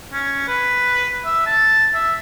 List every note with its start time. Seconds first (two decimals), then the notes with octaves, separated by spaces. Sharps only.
0.13 C#4
0.48 B4
1.25 E5
1.46 A5
1.94 E5